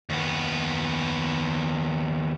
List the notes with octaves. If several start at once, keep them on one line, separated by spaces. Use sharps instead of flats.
D#2 B3